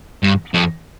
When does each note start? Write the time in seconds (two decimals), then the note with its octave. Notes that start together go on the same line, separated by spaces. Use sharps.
0.23 G2
0.54 F2